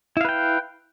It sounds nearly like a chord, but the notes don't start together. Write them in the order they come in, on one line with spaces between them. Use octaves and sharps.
E4 F5 B4 G5